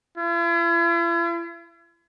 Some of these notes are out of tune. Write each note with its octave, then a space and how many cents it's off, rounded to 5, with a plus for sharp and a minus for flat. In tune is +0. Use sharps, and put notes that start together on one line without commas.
E4 +45